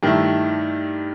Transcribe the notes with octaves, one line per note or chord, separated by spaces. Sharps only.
G2 D#3 A3 E4